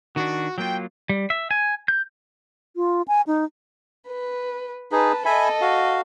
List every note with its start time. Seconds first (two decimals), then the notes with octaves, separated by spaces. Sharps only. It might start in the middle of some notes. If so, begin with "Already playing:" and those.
0.16 D#3 D4 F#4
0.58 F#3 A#3 F4 G5
1.09 G3
1.30 E5
1.51 G#5
1.88 G6
2.76 F4
3.08 G#5
3.27 D#4
4.08 B4
4.92 D#4 G#4 B4 A5
5.25 A4 D#5 E5 G#5 B5
5.61 F#4 F5